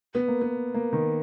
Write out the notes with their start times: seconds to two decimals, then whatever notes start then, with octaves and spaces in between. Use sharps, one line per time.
0.15 B3
0.28 A#3
0.41 B3
0.74 A#3
0.93 D#3